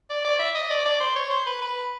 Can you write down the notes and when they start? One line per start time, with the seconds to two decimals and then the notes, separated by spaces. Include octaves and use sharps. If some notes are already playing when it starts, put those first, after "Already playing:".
0.10 D5
0.25 D5
0.39 E5
0.55 D#5
0.70 D5
0.85 D5
1.00 C5
1.16 C#5
1.30 C5
1.46 B4
1.62 B4